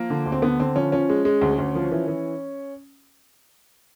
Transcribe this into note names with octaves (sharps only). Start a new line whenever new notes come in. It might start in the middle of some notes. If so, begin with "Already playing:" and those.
Already playing: F3 A#3
D3
D2
C4
D3 B3
D3 C4
F3 C#4
F3 C#4
G#3
G#3
D2
D2
F3
E3
E3